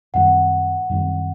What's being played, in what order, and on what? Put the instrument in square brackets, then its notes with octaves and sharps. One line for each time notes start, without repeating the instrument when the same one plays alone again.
[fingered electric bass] F#2 D#3 G3 C4 [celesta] F#5
[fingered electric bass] F#2 D#3 G3 C4